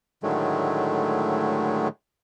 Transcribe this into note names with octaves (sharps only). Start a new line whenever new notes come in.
A2 D3 D#3 F#3 G#3 A3